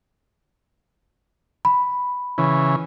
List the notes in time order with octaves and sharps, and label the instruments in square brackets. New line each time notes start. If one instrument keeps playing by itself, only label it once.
[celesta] B5
[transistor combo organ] C#3 E3